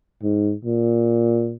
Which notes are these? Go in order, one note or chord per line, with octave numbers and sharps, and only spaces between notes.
G#2
A#2